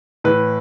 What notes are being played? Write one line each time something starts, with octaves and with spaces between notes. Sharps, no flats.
A2 E3 B4